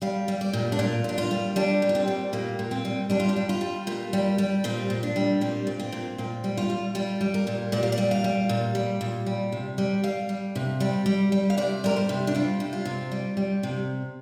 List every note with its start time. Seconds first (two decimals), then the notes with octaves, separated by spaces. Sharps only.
0.02 G3 F5
0.28 G3
0.41 D5
0.53 A#2
0.72 D4
0.79 A#2 F4
1.04 A#2 D4
1.18 F4
1.31 G3
1.56 G3 D4
1.82 A#2
1.89 D4
1.95 C4
2.08 G3
2.33 A#2 A#3
2.59 A#2
2.71 C4
2.85 G3
3.10 G3 D4
3.20 F4
3.29 D4
3.36 G3
3.49 F4
3.61 G3
3.87 A#2 F4
4.13 G3
4.38 G3
4.64 A#2 C4
4.90 A#2
5.03 D4
5.16 G3
5.41 A#2 C4
5.67 A#2
5.79 C4
5.92 A#2
6.18 A#2 C4
6.44 G3
6.57 F4
6.70 G3
6.95 G3 F4
7.21 G3
7.34 A#4
7.47 A#2
7.72 A#2 D5
7.83 F5
7.92 D5
7.98 G3
8.11 F5
8.24 G3
8.49 A#2
8.75 G3
9.01 A#2
9.26 G3
9.52 C3
9.78 G3
10.04 G3 F5
10.29 G3
10.56 C3
10.80 G3
11.06 G3
11.32 G3
11.50 F5
11.58 C3 D5
11.84 G3 A#4
11.96 C5
12.09 C3
12.27 D4
12.35 G3 F4
12.60 C3
12.73 F4
12.85 C3
13.12 G3
13.37 G3
13.63 C3